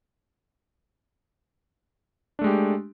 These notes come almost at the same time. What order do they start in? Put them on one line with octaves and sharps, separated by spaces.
D4 A3 G#3 G4